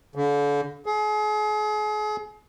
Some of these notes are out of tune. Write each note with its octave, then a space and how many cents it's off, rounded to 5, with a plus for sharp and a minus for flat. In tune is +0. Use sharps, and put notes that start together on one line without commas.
D3 -40
G#4 +35